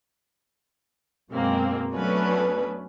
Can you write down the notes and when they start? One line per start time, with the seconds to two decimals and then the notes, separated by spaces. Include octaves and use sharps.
1.31 F#2 B2 G#3 A#3 C4
1.94 F#3 A3 B3 C#4 D4 B4